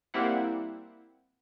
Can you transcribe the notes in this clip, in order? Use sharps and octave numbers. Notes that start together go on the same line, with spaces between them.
G3 A#3 C4 E4 F#5